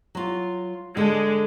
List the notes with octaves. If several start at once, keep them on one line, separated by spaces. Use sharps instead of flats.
F#3 F4
D3 G#3 A5